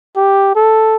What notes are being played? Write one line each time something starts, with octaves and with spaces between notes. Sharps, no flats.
G4
A4